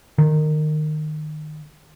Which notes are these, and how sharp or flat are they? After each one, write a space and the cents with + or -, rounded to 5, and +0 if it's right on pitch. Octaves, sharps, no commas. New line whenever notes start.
D#3 -25